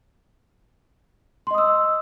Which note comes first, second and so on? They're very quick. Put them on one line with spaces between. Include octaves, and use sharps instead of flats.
C6 D#5 D#6 E6